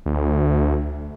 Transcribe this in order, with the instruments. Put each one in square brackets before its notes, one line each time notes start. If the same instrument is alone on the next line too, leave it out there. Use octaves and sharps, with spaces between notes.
[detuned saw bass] D2